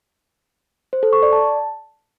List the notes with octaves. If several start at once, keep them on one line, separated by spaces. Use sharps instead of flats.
C5
A4
C#6
D5
A5